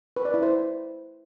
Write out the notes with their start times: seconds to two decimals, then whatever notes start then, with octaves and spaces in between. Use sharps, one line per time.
0.16 B4
0.25 D5
0.34 E4
0.43 C5